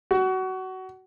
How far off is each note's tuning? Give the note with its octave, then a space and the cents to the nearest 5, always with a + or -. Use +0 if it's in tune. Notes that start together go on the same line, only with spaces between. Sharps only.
F#4 +20